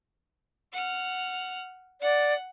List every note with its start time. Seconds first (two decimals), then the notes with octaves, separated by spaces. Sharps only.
0.72 F#5 F6
2.02 D5 F#5